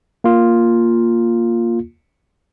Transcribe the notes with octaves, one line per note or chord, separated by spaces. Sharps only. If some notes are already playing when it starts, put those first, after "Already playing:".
A#3 F4